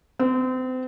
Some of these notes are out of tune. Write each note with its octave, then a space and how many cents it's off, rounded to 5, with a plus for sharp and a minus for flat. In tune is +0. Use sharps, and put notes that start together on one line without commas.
C4 -35